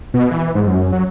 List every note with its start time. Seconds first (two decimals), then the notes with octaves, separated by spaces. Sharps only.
0.14 B2
0.31 E3
0.55 G#2
0.67 F#2
0.92 F#3